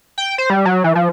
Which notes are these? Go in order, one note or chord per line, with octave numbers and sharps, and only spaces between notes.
G5
C5
G3
F#3
E3
F3